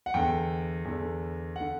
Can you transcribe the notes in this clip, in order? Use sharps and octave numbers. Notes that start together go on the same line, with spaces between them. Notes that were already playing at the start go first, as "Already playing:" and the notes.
F#5
E2 D3 G5
E2 D3
D3 F#5